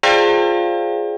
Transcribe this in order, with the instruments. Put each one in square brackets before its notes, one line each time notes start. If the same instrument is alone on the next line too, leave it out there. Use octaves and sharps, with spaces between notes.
[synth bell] F4 G#4 C5 D5 F5 G5